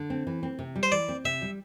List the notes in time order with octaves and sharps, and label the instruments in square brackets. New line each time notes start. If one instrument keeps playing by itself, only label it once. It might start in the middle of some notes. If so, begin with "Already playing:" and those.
Already playing: [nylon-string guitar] D3
C4
E3
C4
C3
G3
[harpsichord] C5
[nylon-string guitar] E3 [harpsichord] D5
[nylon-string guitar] C4
[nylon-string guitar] C3 [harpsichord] E5
[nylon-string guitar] G3